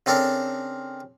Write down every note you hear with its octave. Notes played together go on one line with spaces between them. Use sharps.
C#3 C4 D4 A4 A#4